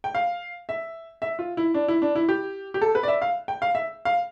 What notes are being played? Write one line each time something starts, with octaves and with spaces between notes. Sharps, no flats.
G5
F5
E5
E5
F4
E4
D4
E4
D4
E4
G4
G4
A4
B4
D5
E5
F5
G5
F5
E5
F5